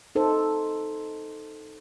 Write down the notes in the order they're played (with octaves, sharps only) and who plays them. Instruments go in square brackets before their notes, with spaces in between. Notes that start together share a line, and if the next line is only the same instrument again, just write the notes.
[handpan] D#4 A4 C5